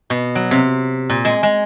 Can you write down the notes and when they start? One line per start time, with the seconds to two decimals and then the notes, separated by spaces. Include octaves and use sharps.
0.10 B2
0.35 F#3
0.51 C3
1.10 A#2
1.25 G#3
1.43 G#3